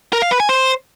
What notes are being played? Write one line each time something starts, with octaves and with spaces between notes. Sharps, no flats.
A#4
F5
B4
G#5
C5